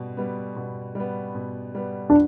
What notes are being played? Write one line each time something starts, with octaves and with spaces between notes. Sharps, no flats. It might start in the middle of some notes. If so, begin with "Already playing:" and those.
Already playing: B2 G3
G3 B3
B2
G3 B3
B2
G3 B3
D4